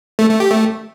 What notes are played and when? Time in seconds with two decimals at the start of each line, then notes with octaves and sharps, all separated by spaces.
0.19 A3
0.29 A3
0.40 G4
0.51 A3